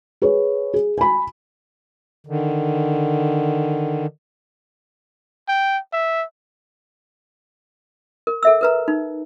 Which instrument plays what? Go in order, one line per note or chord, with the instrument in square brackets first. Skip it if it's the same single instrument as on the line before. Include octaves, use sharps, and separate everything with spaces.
[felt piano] G#4 B4 C#5
G#4
G#5 B5
[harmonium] D3 D#3
[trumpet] G5
E5
[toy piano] A#4
A4 E5 E6
A#4 B4 A#5
D#4